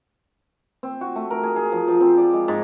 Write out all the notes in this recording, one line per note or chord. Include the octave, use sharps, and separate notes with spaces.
C4
F#4
A3
A#4
G#4
G#4
F3
F3
C4
D5
G#3
G#2